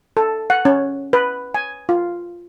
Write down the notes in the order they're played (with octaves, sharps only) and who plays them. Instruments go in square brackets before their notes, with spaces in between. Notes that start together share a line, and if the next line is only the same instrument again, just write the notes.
[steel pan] A4
F#5
C#4
B4
G#5
F4